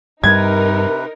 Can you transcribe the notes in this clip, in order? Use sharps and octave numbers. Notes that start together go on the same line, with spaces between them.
G2 C3 G3 D#4 A#4 B4 G#6